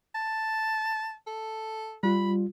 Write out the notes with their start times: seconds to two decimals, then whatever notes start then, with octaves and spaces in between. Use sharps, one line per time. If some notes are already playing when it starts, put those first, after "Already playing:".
0.15 A5
1.27 A4
2.03 G3 F4 B5